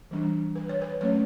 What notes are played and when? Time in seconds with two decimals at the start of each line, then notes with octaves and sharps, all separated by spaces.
0.11 E3 G3 D4
0.55 B4
0.69 C#5
0.82 B4
1.01 F#3 A3 C#4 C#5